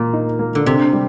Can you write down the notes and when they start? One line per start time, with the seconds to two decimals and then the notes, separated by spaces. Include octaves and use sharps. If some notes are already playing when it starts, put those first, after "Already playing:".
Already playing: A#2 A#3
0.13 D#4
0.39 A#3
0.55 D3
0.66 C3 C4
0.93 G3